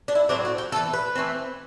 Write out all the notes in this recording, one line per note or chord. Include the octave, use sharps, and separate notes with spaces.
D4
E4
A2 F#3 C4 D4
F#4
G4
E3 B3 A4
B4
E3 A3 C4